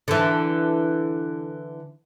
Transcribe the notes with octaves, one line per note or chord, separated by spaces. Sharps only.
D3 E3